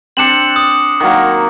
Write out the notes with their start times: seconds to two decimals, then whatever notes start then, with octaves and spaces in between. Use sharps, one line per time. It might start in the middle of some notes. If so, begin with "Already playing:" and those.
0.17 C4 D4 C#7 E7 F#7
0.56 D#6
1.00 D#3 F#3 A#3